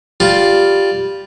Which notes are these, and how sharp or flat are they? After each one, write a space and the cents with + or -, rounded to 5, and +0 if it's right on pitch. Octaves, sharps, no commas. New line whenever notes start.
G3 +0 F4 +0